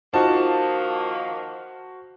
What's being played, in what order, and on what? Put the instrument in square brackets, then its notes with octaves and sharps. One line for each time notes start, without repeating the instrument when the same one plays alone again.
[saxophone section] D#3 F3 A#3 [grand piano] D#4 F4 [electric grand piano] F#4 C5 [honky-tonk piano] A5